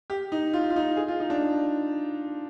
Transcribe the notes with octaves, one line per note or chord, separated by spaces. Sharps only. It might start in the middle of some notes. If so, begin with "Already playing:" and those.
G4
D#4
F4
F4
D#4
G#4
F4
D#4
D4